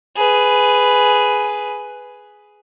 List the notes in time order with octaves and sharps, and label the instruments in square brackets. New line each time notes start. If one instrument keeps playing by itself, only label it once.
[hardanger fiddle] G#4 B4